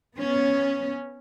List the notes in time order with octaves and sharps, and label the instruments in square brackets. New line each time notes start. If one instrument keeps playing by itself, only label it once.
[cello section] B3 C#4